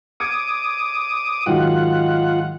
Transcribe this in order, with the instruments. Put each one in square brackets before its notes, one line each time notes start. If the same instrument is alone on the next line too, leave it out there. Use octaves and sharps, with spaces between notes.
[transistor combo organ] D6 D#6 [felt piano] G#6 C#7
[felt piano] G#2 D#3 F#3 [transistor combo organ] F4 F#5